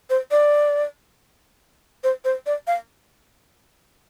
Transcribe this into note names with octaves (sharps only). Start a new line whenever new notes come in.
C5
D5
C5
C5
D5
F5